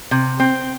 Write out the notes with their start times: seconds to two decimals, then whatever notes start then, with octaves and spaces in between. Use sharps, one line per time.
0.11 C3
0.40 C4